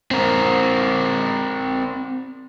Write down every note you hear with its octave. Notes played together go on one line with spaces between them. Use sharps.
C4 A#4